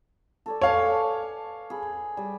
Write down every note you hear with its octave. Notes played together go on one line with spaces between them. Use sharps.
A4 C#5 D5
B4 C#5 F5 G#5 A5
G#4 B5
G3